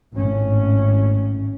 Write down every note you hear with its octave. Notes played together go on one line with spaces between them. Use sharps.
G#1 A2 C#4